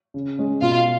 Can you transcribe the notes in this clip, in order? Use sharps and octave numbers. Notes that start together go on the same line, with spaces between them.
C#3
G#3 C#4
B2 F4 F5